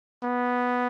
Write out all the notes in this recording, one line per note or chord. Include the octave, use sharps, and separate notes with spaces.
B3